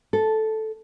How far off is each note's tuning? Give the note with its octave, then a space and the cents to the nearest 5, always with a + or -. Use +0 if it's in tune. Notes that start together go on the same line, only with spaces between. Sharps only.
A4 -5